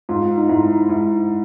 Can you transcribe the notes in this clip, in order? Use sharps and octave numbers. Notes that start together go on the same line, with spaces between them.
G#2 F4
D#4
G#2 E4
G#2 E4